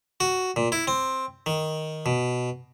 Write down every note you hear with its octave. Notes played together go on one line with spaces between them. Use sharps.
F#4
A#2
E4
C4
D#3
B2